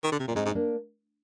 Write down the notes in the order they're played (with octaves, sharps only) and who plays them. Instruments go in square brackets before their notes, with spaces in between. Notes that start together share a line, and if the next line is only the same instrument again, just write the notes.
[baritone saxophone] D#3
D3
C3
A#2
[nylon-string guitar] D4
[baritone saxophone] G#2 [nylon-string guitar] C4 D#4
[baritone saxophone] G#2
[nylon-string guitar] D#4
A#3 D4